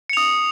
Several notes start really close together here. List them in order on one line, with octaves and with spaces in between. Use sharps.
C#7 F7 D#6